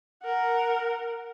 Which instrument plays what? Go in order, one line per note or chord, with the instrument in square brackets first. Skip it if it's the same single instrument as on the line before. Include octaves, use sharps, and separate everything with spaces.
[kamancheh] A#4 F#5